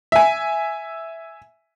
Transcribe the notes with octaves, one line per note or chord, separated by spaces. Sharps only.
E5 G#5